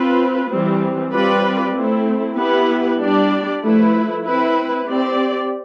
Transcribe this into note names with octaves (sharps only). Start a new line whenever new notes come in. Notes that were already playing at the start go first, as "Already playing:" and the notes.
Already playing: C4 F4 B4
E3 G3 C4
G3 C4 F4 B4 D5
A3 C4 E4
B3 E4 G4 B4
G3 D4 G4 D5
F3 A3 E4 B4
C4 E4 B4
C4 G4 D5